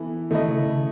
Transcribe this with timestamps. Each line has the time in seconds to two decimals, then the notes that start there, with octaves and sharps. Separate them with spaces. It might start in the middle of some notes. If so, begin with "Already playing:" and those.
Already playing: E3 B3 E4 A4
0.31 D#3 A3 E4 A4 D#5
0.48 C#3
0.65 C#3